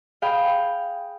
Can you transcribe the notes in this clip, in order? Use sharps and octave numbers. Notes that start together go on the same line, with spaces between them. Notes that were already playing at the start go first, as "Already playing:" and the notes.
G#4 F5 G5 B5